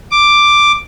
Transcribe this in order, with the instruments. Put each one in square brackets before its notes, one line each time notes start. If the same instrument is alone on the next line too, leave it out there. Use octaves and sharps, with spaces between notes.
[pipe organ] D6